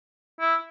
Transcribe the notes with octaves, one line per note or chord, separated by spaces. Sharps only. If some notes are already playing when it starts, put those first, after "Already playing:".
E4